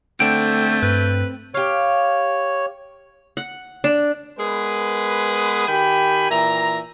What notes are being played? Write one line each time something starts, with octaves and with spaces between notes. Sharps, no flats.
D3 A3 C4 G5 G6
G2 B4
G4 C#5 F5
F#5
D4
G#3 B3 G#4 A#4 B4
D#3 G4 G5 G#5 B5
A#2 E3 E5 A#5